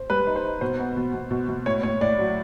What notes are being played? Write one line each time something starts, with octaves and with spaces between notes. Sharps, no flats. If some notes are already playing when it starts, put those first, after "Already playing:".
Already playing: C5
G3 B4
D#4
C5
D#4
B2 C5
B3
B2
B2
B2
B2
A2 C#5
A2 C#5
A2 D5
F#3